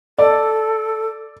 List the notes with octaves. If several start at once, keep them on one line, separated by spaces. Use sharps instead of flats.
A4 D5